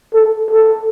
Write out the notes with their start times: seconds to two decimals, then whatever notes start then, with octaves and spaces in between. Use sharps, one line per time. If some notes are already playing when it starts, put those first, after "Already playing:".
0.14 A4
0.51 A4